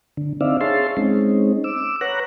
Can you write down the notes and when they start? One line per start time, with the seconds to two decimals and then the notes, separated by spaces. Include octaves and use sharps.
0.17 D3
0.41 C4 D4 D#4 D5 E5 F5
0.61 G#4 C#5 E5 F5 A5 C6
0.97 G#3 C4 C#4 D#4
1.64 D6 E6
2.01 B4 C#5 F#5 A#5 F#6